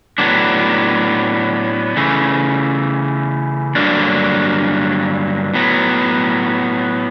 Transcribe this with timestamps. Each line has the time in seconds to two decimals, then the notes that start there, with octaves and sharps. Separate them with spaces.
0.18 A2 F#3 B3 D4
1.97 C#3 E3 A3
3.75 G2 D3 F#3 A#3 D4
5.54 A2 F#3 B3